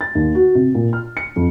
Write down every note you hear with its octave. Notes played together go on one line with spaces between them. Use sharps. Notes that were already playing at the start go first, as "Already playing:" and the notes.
A6
D#2
F#4
C3
A#2
F6
C#7
F2